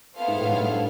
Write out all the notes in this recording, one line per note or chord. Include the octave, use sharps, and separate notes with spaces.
B3 E4 A4 C5 F5
G#2
A2
G2
G2